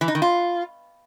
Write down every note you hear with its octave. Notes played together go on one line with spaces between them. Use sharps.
E3
D#4
D#3
F4